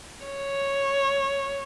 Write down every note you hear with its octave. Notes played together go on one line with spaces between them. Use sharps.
C#5